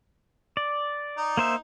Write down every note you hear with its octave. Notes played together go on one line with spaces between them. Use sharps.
D5
D#4
A#3 C5 E5